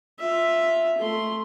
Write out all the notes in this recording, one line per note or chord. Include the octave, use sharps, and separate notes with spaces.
F4 E5
A3 C6